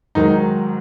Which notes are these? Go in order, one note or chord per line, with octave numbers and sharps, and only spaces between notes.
G#2 D#3 F#3 D#4